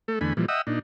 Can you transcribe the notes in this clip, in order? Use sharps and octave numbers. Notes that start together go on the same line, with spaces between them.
A3 A4
E2 D3 A3 G#5 B5
A#2 E3 F3 G3
D#5 E5 F#5 G5 D#6 E6
A#2 D4 D#4